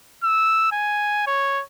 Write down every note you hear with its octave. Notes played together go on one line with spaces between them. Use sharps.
E6
G#5
C#5